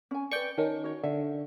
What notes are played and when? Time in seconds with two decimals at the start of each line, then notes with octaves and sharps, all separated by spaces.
0.11 C#4 G#5
0.31 B4 D5 G5 C#6
0.58 D#3 C#4 A#4 A5
0.84 F#4 C#5
1.04 D3 E5